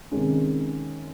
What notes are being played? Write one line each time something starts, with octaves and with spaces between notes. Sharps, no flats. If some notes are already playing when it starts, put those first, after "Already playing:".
C3 D#3 G#3 C#4